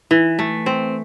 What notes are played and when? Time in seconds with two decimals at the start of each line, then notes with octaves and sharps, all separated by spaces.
0.11 E3
0.39 A3
0.66 C4